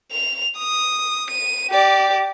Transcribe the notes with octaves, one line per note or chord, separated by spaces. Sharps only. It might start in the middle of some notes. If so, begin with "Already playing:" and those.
F7
D#6
D#7
G4 D5